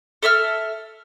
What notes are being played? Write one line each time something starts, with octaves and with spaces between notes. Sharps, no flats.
A4 E5 E6 F6